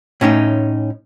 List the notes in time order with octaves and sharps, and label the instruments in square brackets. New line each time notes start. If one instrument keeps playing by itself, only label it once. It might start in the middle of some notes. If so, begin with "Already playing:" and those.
[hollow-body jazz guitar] A2 C#4 D#4